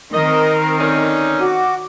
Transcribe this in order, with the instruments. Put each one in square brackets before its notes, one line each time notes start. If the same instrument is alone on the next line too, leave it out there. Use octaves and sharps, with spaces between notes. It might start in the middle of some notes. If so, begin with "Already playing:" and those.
[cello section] D#3 C4 [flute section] A#4 [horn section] D#5
[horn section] D3 C#4 D#4
[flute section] F#4 D6